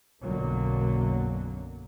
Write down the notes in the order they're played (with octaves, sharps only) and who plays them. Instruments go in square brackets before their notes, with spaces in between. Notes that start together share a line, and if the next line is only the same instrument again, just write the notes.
[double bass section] B1 F#2 B2 D3 F#3 A#3